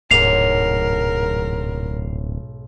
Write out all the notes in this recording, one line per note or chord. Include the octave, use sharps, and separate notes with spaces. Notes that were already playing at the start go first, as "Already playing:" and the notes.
D1 B1 G#2 A#4 C7 F7